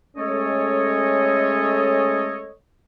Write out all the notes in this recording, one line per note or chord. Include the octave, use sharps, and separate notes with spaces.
G#3 A3 C#4 A4 C#5 D#5